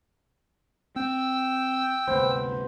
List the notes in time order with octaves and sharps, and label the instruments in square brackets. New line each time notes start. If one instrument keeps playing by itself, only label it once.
[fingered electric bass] C4 [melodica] G5 E6
[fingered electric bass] D2 G2 C3 [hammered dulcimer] B3 C5